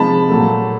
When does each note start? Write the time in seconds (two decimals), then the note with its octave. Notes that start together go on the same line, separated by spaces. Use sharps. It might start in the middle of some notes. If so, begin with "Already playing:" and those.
Already playing: C3 F3 G#3 A5 B5
0.29 A#2 F#3 A3